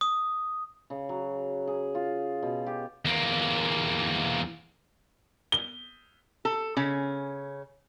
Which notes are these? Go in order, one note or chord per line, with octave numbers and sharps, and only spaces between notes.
D#6
C#3
F#3
G#4
F4
B2
G4
E2 A#3
G7
A4
C#3 C#4